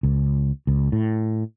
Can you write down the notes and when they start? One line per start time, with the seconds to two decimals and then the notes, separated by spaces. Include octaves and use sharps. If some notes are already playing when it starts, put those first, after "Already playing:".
0.03 C#2
0.67 C#2
0.92 A2